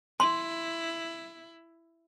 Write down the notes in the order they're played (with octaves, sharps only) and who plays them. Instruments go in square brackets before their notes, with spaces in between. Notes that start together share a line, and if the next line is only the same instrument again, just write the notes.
[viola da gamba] E4 [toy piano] C6